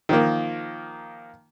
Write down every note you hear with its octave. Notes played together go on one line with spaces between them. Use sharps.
D#3 F3 A#3